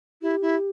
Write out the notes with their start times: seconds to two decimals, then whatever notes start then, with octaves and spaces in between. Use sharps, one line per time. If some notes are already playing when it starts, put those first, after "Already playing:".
0.22 E4 G4
0.42 E4